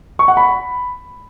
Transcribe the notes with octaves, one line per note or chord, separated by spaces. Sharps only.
C#6
F#5
B5